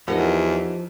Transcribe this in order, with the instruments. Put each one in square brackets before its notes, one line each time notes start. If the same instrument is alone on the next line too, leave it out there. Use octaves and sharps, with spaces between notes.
[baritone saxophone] E2 [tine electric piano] F3 [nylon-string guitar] D#4 A#4 F#5 [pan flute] G4